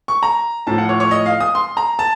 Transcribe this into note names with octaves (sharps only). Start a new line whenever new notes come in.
C#6
A#5
A2 F3 A5
F#5
C#5
C#5
D#5
F5
D#6
C6
A#5
A5